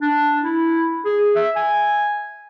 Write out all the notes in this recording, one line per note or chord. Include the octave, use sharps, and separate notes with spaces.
D4
E4
G#4
E5
G#5